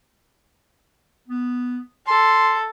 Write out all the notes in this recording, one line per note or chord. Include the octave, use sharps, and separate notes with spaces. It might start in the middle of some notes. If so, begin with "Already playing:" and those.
B3
A4 C6